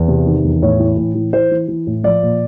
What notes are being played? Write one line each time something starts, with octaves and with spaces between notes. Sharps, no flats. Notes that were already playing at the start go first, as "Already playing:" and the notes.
Already playing: E2
C3
D#3
E2
A2 C#5
E3
A2
E3
E3 C5
E3
E3
A2
F3 D5
A#2